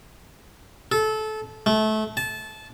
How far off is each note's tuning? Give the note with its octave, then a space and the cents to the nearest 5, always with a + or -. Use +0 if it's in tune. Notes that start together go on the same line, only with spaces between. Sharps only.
A4 -25
A3 -25
A5 -20